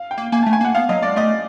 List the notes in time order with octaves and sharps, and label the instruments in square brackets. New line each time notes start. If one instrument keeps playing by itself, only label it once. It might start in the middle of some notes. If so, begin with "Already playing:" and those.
Already playing: [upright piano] F5
G5
[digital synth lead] A#3
[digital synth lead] A#3 [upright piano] G#5
[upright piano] A5
[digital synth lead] A3
[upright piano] G#5
[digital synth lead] A#3 [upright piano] F#5
[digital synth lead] B3 [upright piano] F5
[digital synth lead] F#3 [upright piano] D#5
[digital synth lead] G#3 [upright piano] D5
[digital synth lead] A3 [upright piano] D#5